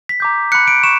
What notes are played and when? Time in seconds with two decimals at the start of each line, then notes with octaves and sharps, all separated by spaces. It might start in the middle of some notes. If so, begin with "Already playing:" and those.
0.09 B6
0.20 A#5 D6 G6
0.52 B5 F#6 C#7
0.68 D7
0.83 C#6 E7